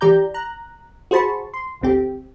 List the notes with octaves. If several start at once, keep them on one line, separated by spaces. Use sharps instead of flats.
E3 G4 D5 A#5 G6
A#5 F#6
F#4 G#4 C5 A5 B5 C#6
C6
G#1 D2 C4 G4